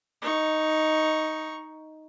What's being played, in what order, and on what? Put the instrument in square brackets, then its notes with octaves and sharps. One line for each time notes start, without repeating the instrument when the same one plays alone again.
[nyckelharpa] D#4 C#6